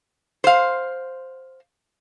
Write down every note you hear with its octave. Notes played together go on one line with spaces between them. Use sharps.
C5 F5